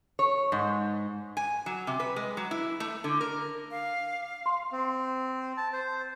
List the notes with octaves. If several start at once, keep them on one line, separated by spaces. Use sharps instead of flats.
C#5
G#2
G#5
F#3
C3
B4
G#3
F#3
E4
A3
D3
A#4
F5
C6
C4
A5
C5